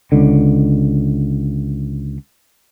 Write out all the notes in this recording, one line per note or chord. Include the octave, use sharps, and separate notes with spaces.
C#2 D3